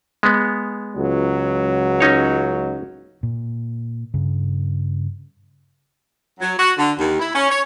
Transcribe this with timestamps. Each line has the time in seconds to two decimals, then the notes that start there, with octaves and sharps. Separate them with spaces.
0.23 G#3 B3
0.96 C#2 F#3
2.00 C#4 D#4 C#5
3.23 A#2
4.14 G2 C#3
6.40 F#3
6.58 F#4
6.77 D3
6.98 D#2
7.19 E4
7.34 C#4
7.50 C#5